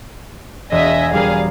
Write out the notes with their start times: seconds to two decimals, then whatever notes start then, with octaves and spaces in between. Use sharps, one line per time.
0.72 E1 D#5 E5 G#5
1.13 G3 G#4 A#4 F5